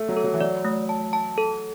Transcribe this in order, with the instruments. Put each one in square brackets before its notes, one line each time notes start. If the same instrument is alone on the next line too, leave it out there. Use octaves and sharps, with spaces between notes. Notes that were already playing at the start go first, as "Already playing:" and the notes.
Already playing: [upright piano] A3
F#3
[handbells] A4
[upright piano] F#3
E3
[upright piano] F#3 [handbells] D5
[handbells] A3
A5
A5
A4